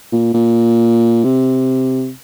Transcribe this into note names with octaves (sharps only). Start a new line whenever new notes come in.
A#2
A#2
C3